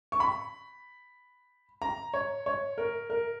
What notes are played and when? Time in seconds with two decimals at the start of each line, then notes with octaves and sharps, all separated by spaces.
0.12 C#6
0.20 B5
1.82 A#5
2.14 C#5
2.46 C#5
2.78 A#4
3.10 A#4